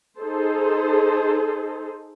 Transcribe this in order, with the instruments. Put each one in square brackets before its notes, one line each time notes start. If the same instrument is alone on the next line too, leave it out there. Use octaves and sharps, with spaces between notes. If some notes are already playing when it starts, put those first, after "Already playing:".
[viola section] D#4 G#4 A4 C5